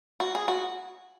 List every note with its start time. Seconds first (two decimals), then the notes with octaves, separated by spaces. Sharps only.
0.20 F#4
0.35 G#4
0.48 F#4